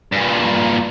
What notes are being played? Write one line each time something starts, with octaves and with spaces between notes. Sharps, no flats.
G2 A#2